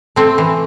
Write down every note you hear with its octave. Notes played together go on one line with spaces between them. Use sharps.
A3 C4
E3